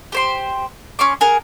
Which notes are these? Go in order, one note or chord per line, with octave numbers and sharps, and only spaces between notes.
G4 C5 C6
C#4 C6 D6
G#4 A#4 F#5